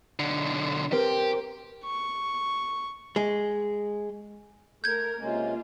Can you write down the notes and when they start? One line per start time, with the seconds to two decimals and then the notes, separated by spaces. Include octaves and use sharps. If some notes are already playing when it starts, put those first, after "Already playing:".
0.19 B1 D3
0.92 C4 G4 A#4
1.84 C#6
3.16 G#3
4.84 A3 A#4 G6 G#6
5.19 C3 G#3 A#3 C#4 F4